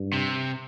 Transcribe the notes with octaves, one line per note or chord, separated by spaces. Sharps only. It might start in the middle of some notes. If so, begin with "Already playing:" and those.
Already playing: G2
C3